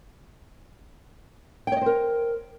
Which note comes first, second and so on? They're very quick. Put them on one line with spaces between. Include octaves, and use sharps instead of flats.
G5 C#5 D#5 C5 A#4